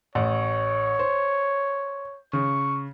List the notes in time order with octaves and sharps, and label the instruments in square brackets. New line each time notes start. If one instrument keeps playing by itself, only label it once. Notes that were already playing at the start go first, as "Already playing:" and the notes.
[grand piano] A1 [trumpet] C#5
[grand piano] C5
[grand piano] C#3 [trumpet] C#6